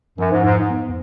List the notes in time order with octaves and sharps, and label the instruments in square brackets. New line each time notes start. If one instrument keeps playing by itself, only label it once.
[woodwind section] F#2 [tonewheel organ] F3
[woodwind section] G#2
[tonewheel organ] F2 [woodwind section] G#2
[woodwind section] G#2
[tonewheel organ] B3